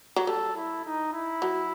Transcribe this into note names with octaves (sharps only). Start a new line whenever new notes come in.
F#3
G3 A4
E4
D#4
E4
F#3